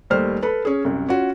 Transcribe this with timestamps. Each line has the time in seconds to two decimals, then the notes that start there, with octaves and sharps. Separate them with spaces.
0.10 D#2 G3 A3 C5 F6
0.42 A4 B4 B5
0.65 C#4 G#4
0.84 C2 F#2
1.09 C#4 F4 F#4